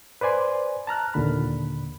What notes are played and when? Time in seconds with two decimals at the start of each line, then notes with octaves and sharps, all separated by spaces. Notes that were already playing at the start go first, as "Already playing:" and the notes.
0.21 B4 C5 D5 G#5 C6
0.87 A5 A#5 F6 F#6
1.14 D#2 A#2 D3 B5